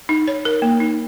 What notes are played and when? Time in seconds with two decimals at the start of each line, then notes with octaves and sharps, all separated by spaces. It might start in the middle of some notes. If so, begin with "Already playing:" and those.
0.09 D#4
0.28 C#5
0.45 A#4
0.62 A#3
0.80 D#4